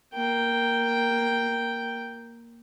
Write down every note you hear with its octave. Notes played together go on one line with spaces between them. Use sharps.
A#3 G5